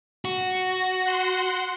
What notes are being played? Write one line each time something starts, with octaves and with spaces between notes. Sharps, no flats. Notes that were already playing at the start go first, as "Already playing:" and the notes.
F#4
F#5 C6